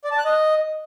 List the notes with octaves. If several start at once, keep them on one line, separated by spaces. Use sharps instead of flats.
D5
A5
F#6
D#5